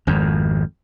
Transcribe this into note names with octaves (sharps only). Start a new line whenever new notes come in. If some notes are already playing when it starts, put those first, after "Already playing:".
G#1 F2